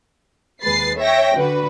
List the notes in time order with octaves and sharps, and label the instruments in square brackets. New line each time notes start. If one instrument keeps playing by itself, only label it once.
[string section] D#2 G#3 B4 A6 C7
C#5 E5 G5 A#6
D3 F#4 B4